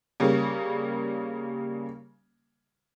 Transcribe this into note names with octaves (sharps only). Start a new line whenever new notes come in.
C#3 G3 A#3 C#4